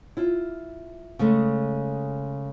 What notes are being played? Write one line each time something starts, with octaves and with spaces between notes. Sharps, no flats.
E4 F4
C#3 G#3 A3